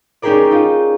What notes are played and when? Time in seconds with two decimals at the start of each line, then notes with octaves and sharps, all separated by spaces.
0.22 C#4 D#4 G4 G#4 A#4 D5
0.51 D#4 F4